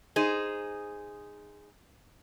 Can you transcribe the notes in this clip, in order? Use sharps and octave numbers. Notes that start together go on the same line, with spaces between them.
D#4 G#4 C5